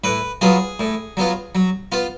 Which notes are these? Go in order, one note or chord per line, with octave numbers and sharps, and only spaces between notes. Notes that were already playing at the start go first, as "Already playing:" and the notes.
A2 B4
F#3 B3 F4 G#4
A2
F#3 B3 F4
F#3
B3 F4